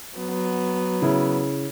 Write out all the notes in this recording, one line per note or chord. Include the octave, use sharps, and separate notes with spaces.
F#3 B3
C#3 E4